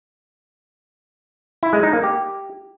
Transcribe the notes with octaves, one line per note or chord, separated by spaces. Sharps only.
E4
G#3
D#4
A#3
G4